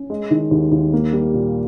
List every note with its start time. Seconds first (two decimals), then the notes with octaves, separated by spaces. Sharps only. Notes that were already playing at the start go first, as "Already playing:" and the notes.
Already playing: C#4
0.10 G#3
0.31 D#3
0.51 D#2
0.71 D#2
0.93 A#3
1.13 G3
1.34 A#2